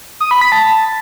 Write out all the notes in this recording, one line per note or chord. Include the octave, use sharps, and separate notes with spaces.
D#6
B5
B6
A5